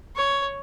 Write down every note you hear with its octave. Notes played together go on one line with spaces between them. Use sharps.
C#5